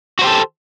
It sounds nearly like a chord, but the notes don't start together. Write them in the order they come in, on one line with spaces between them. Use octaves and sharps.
F#4 C5 G4 A4